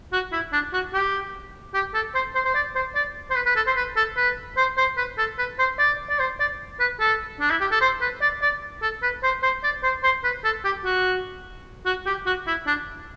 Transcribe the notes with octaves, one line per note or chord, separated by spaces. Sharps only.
F#4
E4
D4
F#4
G4
G4
A4
C5
C5
C5
D5
C5
D5
C5
B4
B4
A4
C5
B4
A4
B4
C5
C5
B4
A4
B4
C5
D5
D5
C5
D5
B4
A4
D4
E4
G4
A4
C5
B4
D5
D5
A4
B4
C5
C5
D5
C5
C5
B4
A4
G4
F#4
F#4
G4
F#4
E4
D4